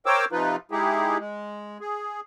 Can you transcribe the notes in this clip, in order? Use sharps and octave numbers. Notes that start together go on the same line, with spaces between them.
A#4 C5 C#5 G5 D6 E6
C3 F3 D#4 F4 B4
G#3 D#4 E4 G4 G#4
G#3
G#4